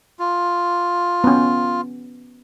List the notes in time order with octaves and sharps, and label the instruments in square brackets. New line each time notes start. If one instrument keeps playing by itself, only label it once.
[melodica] F4
[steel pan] B3 C#4